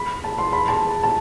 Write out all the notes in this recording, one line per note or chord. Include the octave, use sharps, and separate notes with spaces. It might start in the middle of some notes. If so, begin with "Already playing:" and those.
Already playing: B5
A5
C6
B5
A5
A5